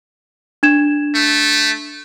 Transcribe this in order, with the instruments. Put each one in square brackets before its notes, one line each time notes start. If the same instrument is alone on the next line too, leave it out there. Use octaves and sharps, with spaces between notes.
[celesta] D4 G#6 E7
[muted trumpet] A3